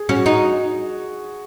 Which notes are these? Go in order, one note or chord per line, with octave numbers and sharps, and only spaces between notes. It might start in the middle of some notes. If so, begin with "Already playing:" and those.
Already playing: G#4
C#4 F#4
D#4 F#4